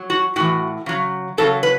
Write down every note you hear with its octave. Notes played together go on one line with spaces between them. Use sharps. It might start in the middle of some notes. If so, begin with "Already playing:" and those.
Already playing: F#3
F#4
A2 E3 F#4
C#3 F#3
C#3 F#3 A4
B4